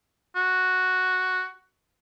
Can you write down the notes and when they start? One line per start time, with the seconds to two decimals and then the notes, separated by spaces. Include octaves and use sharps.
0.36 F#4